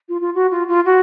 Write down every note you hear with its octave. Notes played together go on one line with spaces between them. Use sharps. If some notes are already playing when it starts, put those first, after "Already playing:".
F4
F4
F#4
F4
F4
F#4